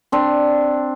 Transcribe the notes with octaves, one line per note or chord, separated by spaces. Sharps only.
C4 D4